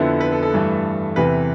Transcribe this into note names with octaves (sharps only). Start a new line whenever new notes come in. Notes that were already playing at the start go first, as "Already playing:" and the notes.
Already playing: F2 D3 F3 B3 E4
B4
A4
A4
G2 E3 A3
E2 C3 E3 B4